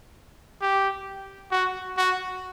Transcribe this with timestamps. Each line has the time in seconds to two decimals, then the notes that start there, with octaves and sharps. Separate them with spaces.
0.62 G4
1.51 F#4
1.97 F#4